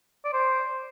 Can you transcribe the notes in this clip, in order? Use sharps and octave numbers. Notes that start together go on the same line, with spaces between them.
D5
C5